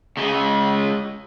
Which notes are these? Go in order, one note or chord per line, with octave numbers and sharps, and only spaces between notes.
C#3 G#3